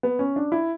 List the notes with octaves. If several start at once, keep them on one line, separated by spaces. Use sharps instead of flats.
B3
C#4
D4
E4